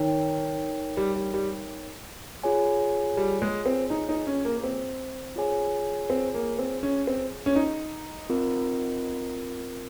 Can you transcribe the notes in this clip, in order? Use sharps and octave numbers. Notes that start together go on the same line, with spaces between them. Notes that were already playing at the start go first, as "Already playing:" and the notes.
Already playing: D#3 D#4 A#4 C#5 G5
G3
G3
G3
F4 G#4 C#5 G#5
G3
G#3
C4
D#4
D#4
C#4
A#3
A#3
C4
F4 G#4 C#5 G#5
C4
A#3
C4
C#4
C4
C#4
D#4
C4 F4 A#4